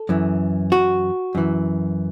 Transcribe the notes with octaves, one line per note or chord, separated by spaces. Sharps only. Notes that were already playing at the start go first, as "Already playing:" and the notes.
Already playing: A4
F#2 E3
F#4
F#2 E3